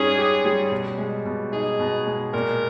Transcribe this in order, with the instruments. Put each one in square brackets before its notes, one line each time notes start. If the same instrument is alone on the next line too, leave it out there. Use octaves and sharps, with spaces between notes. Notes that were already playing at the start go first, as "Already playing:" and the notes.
Already playing: [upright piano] G#2 G3 C#4 [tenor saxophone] G#4
[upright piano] G4
G3
B2
G#3
B2
[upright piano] D#4 [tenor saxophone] G#4
[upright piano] B2
G#3
[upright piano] A#2 [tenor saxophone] A#4